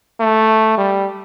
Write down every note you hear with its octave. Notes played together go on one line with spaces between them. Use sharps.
A3
G3